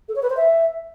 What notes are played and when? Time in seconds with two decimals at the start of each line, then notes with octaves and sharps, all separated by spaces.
0.08 A4
0.15 C#5
0.23 B4
0.30 C5
0.37 E5